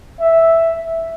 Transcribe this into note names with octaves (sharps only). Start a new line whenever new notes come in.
E5